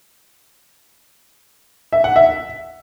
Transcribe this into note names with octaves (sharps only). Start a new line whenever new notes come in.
E5
F#5
E5